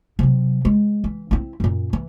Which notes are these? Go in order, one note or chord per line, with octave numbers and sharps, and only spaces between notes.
C3 F#3
G#3
E3
C4 E4
F#2 A#2
E3